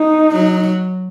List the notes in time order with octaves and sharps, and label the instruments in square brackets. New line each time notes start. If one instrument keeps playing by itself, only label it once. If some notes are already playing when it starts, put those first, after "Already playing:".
Already playing: [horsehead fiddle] D#4
[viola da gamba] F#3